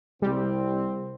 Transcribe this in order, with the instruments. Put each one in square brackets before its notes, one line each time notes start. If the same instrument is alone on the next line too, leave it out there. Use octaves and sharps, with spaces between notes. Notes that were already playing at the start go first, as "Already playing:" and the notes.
[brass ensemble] C2 C4 [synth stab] G3